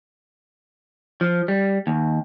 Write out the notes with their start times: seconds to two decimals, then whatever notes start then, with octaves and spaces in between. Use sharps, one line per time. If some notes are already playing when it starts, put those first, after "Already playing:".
1.21 F3
1.48 G3
1.87 D#2